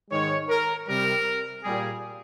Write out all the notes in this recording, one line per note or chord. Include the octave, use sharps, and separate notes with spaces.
G#2 D#3 G#3 C#5
A#4
C3 G3 A#4
A#2 G3 G#4